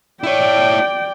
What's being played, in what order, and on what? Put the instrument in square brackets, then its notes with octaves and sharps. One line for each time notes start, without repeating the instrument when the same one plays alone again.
[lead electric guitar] E4 C#5 [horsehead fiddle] D5 G5